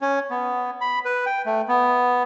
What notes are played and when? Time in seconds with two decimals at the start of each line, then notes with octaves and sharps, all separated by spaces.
0.01 C#4
0.30 B3
0.81 B5
1.05 B4
1.26 G5
1.46 A3
1.68 B3